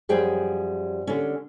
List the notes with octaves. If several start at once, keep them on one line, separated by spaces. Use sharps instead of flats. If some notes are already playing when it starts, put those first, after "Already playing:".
F#2 F3 G3 G#4 G5 G#5
D3 C#4